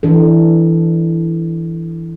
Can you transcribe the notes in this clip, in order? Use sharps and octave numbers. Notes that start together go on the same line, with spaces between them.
E3 D4 A4